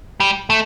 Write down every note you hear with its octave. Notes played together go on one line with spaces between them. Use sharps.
G3
A3